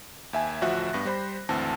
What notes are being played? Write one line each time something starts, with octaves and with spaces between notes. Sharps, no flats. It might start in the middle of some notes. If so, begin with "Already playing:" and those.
D#2 E5 G#5
A1 D2 F3 F#4 E5 F#6
G2 B3 A#6
G3 C5 B5
G#1 D2 E3 C4 A5 A#6